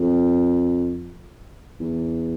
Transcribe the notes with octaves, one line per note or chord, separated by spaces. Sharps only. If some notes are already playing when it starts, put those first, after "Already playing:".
Already playing: F2
E2